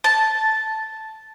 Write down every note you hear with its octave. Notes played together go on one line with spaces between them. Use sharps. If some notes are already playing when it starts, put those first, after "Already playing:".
A5